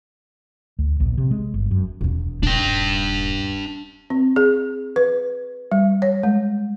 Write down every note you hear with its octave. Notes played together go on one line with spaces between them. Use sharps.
D2
A#1
C3
G#3
G1
F#2
E1 E2
D#1 A#3 D4 G5
C4
G#4
B4
G3
C#5
G#3